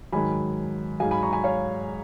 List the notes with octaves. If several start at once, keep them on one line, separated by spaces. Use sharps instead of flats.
G#2 D#3 F#3 G#5 B5
G#2 F#3 F5 G#5
G#5 B5
A#5 C#6
G#5 B5
C#5 F5